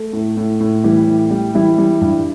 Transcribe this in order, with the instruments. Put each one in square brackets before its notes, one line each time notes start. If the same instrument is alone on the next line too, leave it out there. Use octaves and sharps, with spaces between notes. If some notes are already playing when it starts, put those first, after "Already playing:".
Already playing: [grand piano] A3 A4
A2
A2
A2
E3 G3 G4
A2
G3
E3 G3 E4
G3
G2